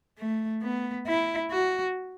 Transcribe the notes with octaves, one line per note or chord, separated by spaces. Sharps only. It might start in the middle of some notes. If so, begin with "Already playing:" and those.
A3
B3
E4
F#4